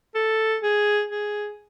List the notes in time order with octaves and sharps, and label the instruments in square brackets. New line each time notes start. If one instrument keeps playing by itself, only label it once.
[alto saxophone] A4
G#4
G#4